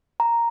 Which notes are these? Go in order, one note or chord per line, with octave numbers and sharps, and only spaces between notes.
A#5